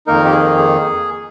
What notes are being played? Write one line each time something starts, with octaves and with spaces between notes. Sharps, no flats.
F2 D#3 A#3 D#4 A#4
G4
G#4
G#4